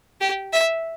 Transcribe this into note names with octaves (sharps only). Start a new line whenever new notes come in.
G4
E5